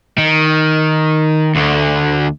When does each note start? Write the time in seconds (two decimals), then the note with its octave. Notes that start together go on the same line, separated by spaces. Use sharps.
0.18 D#3
1.55 D2 D3